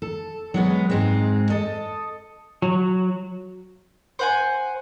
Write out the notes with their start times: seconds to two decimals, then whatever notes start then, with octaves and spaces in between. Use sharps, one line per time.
0.02 A4
0.54 F#3 G#3 B3
0.90 G#2 G#3 C4
1.50 A4 D#5
2.62 F#3
4.19 C5 F#5 G#5